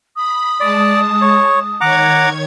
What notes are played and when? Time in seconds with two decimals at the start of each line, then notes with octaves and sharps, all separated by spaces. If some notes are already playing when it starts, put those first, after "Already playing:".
0.16 B5 D#6
0.60 G#3 D5 A5
1.22 C#5
1.81 D#3 C#5 F#5 A#5 D6 G#6